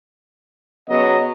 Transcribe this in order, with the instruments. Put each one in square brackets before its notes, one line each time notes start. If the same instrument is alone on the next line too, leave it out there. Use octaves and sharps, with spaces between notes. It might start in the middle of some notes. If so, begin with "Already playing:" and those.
[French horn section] C#3 F#3 B3 [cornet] D#5